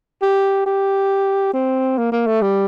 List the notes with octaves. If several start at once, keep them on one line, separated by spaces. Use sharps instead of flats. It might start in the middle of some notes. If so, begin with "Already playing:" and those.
G4
G4
C4
A#3
A#3
A3
G3